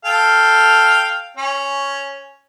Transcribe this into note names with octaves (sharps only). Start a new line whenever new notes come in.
A4 F5 G5
C#4